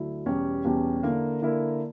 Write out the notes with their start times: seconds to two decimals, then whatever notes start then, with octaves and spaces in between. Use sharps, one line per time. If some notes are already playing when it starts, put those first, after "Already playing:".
Already playing: D2 D3 F#3 E4
0.26 E2 B2 G3 C#4 G4
0.65 E2 B2 G3 C#4 G4
1.03 D3 A#3 E4 A#4
1.42 D3 A#3 E4 A#4